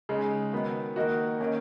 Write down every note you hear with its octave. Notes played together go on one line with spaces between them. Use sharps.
C#3 G#3 D#4
D#3 F#3 B3
D#3 A#3 D#4 F#4
D#3 A#3 C#4